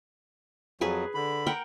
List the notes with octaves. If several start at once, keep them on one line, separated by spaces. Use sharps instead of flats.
F2 F#3 G#4 B4 G#5
D3 B5
A#4 F#5 G5